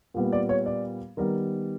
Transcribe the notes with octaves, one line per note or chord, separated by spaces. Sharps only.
A#2 G3 B3
D5
C#5
D5
D#3 G3 B3 A#4